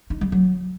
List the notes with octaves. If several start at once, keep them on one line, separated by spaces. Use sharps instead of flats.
D#4
G3
F#3